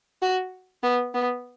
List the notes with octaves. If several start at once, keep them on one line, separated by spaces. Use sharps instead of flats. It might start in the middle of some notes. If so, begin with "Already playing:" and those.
F#4
B3
B3